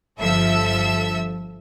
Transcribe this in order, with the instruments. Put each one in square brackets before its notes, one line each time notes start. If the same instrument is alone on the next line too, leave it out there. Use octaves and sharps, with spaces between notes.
[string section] G1 F3 A4 E5 E6